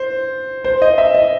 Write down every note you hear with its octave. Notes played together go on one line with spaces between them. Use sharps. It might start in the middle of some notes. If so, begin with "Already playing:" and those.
Already playing: C5
C5
D#5
E5
D#5